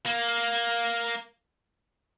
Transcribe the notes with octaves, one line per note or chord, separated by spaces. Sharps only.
A#3